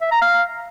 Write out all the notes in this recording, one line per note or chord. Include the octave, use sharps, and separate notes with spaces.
E5
A#5
F5